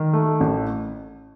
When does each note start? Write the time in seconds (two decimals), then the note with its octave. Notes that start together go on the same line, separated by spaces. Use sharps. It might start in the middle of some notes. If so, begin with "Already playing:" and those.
Already playing: D#3
0.13 A3
0.40 A1